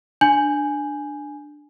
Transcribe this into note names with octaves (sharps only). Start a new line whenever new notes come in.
D4 G#5 G6 F#7